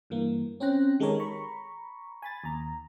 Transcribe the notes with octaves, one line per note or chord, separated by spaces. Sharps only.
G2 E3 A#3
C4 C#4 C5 G5 F#6 A#6
D#3 G#3 G4 A4 A#4 C#5
A#5 B5 C#6
G#5 B5 A6
D#2 A#5